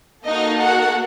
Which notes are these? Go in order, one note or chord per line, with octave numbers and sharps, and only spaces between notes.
A#3 D#4 F#4 A4 D#5
F#4 F#5